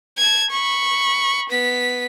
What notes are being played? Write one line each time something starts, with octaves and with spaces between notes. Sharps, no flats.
A5 G#6
B5 C#6
B3 B6